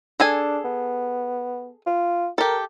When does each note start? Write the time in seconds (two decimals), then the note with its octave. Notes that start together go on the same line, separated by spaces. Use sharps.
0.20 D4 G#4 A4 G#5
0.65 B3
1.87 F4
2.38 G4 A4 A#4